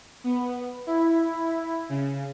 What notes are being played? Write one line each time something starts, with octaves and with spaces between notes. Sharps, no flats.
B3
E4
C#3